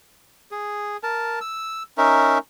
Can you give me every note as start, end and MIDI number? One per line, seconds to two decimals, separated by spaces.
0.51 0.97 68
1.03 1.39 70
1.03 1.39 81
1.41 1.83 88
1.98 2.38 61
1.98 2.38 63
1.98 2.38 70
1.98 2.38 76